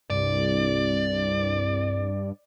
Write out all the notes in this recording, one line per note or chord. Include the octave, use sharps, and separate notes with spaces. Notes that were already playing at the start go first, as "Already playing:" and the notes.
C2 G2 D5